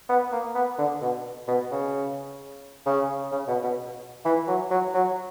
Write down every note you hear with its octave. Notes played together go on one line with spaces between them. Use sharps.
B3
A#3
B3
D3
B2
B2
C#3
C#3
C#3
B2
B2
E3
F#3
F#3
F#3